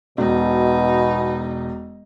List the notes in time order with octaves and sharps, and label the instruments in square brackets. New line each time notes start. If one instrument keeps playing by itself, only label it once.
[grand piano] E1 [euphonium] B2 [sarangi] D#4